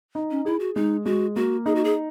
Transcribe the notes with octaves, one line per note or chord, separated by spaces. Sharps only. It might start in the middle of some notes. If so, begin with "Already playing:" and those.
D#4
C#4
E4 G#4
F#4
G#3 D#4
G#3 F#4
A#3 F#4
D#4 G#4
F#4
G#4